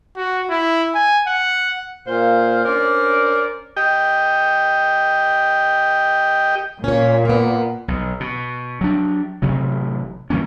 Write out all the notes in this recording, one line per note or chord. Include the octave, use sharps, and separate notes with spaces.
F#4
E4
G#5
F#5
A#2 C5 F5
C#4 D4 A#4 C5 D5
G4 D#5 G5
A#2 C#4 C#5
A#3 B3
B1
B2
F#3 D4
A1 C3 F#3
E3 G3 A#3 C#4